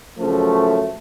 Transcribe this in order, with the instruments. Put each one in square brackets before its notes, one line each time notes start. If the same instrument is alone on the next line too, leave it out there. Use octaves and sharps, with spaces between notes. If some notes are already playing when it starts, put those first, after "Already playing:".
[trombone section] F#2 C#3 F3 A3